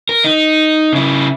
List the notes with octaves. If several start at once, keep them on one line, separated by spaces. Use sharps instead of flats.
A#4
D#4
C#3 E4